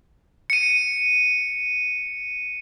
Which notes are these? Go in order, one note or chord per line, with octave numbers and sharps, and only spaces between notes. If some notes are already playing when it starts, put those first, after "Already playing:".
C#7 D#7